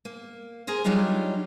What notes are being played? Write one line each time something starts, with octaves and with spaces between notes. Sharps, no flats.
A#3
G#4 A#4 C5
F#3 G3 D4 D#4 F4 G4